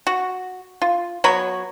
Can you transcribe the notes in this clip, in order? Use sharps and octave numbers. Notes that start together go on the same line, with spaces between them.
F#4
F4
F#3 B3 C#5 B5